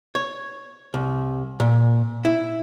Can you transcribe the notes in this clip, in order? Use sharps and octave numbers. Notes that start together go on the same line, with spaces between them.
C#5
C2
A#2
E4